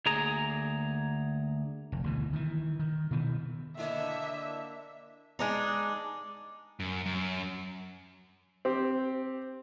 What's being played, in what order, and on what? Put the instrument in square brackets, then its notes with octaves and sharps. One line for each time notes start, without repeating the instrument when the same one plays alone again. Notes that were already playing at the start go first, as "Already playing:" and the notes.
[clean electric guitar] D2 A#3 G#4 A#5
[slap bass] F1
D2 B2 E3
D#3 E3
D#3
B2 D#3 E3
[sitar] D3 E4 D#5 [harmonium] A#3 D4 [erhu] E5
[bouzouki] G#3 D4 D#4
[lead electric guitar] F#2
F#2
[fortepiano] C4 G4